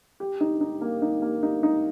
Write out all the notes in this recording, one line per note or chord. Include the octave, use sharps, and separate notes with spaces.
G4
D#4
D#4
A#3
D#4
A#3
D#4
D#4